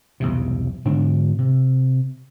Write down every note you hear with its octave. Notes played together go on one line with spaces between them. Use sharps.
B1 E2 G2 C3
G#2 D3 D4
C3